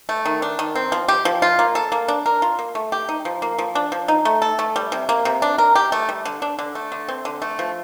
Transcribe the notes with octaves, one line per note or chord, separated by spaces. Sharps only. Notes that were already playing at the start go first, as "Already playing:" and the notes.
A3
D#3
D4
D#3
C4
F3
G4
F3
F4
A#3
A4
A#3
D4
A#4
F4
A#3
A3
G4
D#4
F3
A#3
F3
D4
F3
D#4
A3
A4
A3
G3
C3
A#3
C3
D4
A#4
G4
A3
G3
D3
D4
D3
A3
D3
C4
D3
A3
F3